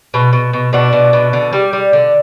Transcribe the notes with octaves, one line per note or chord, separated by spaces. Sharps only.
B2
B2
B2
B2 D4 F#4
B2
B2
D3
G3
G3
D3